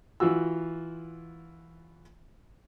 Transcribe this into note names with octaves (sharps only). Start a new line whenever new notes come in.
E3 F4 F#4 E6